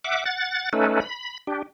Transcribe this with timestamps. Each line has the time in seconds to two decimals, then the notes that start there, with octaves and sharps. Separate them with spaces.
0.04 E5 F#5 D6
0.25 F#5 A6
0.73 A3 C#4 D#4 A4 B4
1.00 B5
1.47 D4 G4